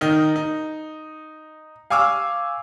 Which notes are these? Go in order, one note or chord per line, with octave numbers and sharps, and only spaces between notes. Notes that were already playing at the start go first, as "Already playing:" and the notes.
D#3 D#4 A#4
D#4
F5 G#5 C#6 D6 E6 F6